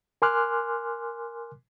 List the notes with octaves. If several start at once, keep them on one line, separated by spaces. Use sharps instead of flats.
A#4 G#5 C6 D6 F6 F#6